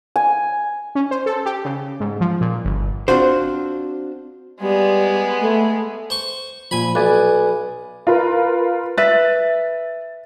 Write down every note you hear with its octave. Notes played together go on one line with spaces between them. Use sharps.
G#5
C#4
C5
A4
G4
C#3
G#2
F3
A#2
G1
C4 D4 F4 F#4 C5
G3 G#3 B3
A3
C5 C#6
A#2 F3 G#5 B5
B1 B4 D5 G#5
F4 A#4 B4
B4 E5 A6